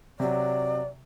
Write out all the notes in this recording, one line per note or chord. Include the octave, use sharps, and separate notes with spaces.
C3 F#3 D5